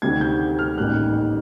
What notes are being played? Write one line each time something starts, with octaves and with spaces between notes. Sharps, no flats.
D2 C3 D#3 G3 G#6
G6
F6
A1 G#2 D#3 G3 A#3 F#6